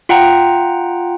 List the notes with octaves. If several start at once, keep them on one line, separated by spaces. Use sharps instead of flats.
F4 F#5 G5 A#5